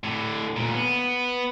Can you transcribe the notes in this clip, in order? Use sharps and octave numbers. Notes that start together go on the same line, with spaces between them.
A2 D3
D2 A#2
B3